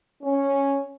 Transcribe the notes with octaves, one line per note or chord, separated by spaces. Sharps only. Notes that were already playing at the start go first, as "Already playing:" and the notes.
C#4